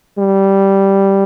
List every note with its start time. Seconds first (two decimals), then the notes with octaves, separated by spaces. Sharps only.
0.19 G3